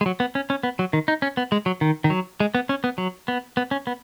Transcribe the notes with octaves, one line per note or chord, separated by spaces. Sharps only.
G#3
F#3
B3
C#4
C#4
B3
F#3
D#3
D#4
C#4
B3
G#3
F#3
D#3
D#3
F#3
G#3
B3
C#4
B3
F#3
B3
B3
C#4
B3